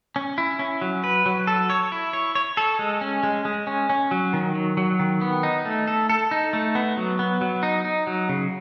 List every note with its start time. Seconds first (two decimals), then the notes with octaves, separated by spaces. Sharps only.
0.16 C#4
0.38 E4
0.59 C#4
0.81 F#3
1.04 B4
1.26 F#3
1.47 A4
1.70 C#5
1.92 E4
2.13 C#5
2.35 C#5
2.57 A4
2.79 G#3
3.01 C#4
3.23 G#3
3.45 G#3
3.67 C#4
3.90 C#4
4.11 F#3
4.33 D#3
4.55 F#3
4.77 F#3
4.99 D#3
5.21 B3
5.43 D#4
5.65 A3
5.87 A4
6.10 A4
6.31 D#4
6.53 A3
6.75 B3
6.97 F#3
7.19 B3
7.41 F#3
7.63 D#4
7.85 D#4
8.07 F#3
8.29 C#3